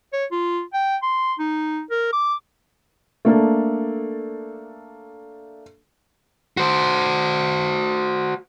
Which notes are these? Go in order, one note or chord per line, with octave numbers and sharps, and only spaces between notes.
C#5
F4
G5
C6
D#4
A#4
D6
A3 A#3 D4 A4
F#4 C5